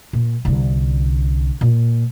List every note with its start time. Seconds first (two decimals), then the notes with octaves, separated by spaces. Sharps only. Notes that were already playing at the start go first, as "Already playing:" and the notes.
0.13 A#2
0.45 C2 D3
1.61 A#2